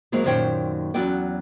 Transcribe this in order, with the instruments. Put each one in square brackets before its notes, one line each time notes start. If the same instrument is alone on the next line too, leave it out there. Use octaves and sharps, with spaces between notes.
[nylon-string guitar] F#3 G#3 A#3 C4
F#2 A#2 D#3 C5 C#5 G5
E2 F#3 C#4 F#4 D5 G5